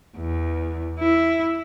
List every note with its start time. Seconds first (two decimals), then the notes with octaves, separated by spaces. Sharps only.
0.17 E2
1.00 E4